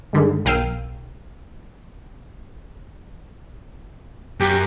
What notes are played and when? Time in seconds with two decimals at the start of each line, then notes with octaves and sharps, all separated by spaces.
0.13 G2 D3 D#3 G#3
0.45 B1 A#4 F5 G5 E6 D#7
4.40 F#2 G4